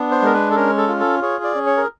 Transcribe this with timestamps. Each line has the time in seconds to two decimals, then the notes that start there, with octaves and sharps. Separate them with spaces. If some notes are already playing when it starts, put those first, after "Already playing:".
Already playing: B3 D4
0.11 C5
0.22 G#3 A#4
0.33 B4
0.51 A4
0.55 C#4 A#4
0.78 A4
0.88 F4
1.00 A4
1.22 G#4 C#5
1.44 D5
1.55 C#4
1.66 C#5
1.77 A#4